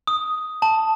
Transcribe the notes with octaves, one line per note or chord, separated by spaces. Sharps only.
D#6
A5